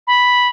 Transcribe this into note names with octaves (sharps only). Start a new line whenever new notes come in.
B5